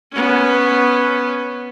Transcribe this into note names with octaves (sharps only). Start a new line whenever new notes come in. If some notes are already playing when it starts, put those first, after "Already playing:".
B3 C#4